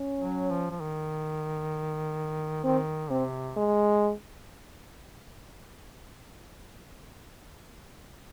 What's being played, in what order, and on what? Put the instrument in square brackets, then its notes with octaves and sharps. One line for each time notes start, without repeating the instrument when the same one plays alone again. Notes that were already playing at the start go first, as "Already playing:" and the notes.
Already playing: [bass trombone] C#4
[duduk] F#3
F3
F3
D#3
[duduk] D#3 [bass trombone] C4
[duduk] C3 [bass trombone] C4
[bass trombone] G#3